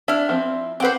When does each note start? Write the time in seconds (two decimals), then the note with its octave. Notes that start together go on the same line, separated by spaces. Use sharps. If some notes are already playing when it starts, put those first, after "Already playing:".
0.08 D4 E4 F6
0.29 F3 C4
0.80 C4 B4 C5 F#5 D6